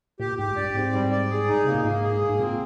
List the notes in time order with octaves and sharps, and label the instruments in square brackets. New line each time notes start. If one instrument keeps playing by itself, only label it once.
[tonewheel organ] A#2 [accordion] G4
[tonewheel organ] G#2 [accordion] G4
[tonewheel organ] G2 [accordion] D5
[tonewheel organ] G#2 [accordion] C4
[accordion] G3
D5
G#4
D#4
[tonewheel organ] C3 [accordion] A#3
[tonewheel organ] A#2
[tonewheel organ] G#2 [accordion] A#3
[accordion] G#4
A#3
[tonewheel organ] G#2
[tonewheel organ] A#2 [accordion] C4